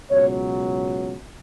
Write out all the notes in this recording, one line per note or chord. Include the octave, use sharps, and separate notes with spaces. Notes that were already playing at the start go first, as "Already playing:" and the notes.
C#2 B2 F#3 C#5